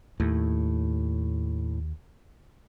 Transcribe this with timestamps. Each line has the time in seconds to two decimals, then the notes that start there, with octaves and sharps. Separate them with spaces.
0.20 D#2 A2